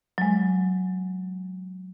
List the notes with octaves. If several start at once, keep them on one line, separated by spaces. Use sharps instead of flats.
F#3 G#3